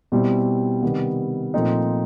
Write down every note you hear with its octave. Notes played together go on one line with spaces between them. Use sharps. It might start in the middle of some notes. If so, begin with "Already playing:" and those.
B2 G3 C4 E4
C3 D#3 G3 B3
A#2 F3 A3 C4 D#4